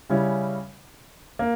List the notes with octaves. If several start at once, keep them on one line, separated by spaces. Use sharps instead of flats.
C#3 G3 C#4 E4
A#3